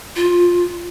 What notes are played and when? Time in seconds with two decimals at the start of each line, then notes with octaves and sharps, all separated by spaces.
0.16 F4